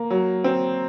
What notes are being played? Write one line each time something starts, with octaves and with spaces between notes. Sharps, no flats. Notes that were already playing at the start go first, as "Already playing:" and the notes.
Already playing: A#3
F#3
C4